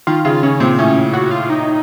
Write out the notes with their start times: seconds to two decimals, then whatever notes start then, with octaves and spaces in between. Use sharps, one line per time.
0.07 D#3 F4
0.25 C#3 F4
0.43 C#3 C#4
0.60 A#2 C4
0.79 A2 C#4
1.13 F#4
1.31 F4
1.50 D#4